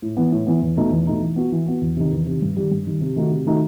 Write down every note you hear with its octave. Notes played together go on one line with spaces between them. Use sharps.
A2
E3 B3
A2
E3 B3
E2
B2 A3 D#4
E2
B2 A3 D#4
E3
B3 F#4
E3
B3 F#4
E2
C3 D#3
E2
C3 D#3
G2
D#3 G3
G2
D#3 G3
C3
D#3 A3 D#4 F#4
C3
D#3 A3 D#4 F#4